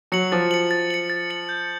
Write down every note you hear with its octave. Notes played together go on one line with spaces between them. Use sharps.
F#3 C#7 F#7
F3 A6
C#7 F#7
A6
C#7 F#7
A6
C#7 F#7
G6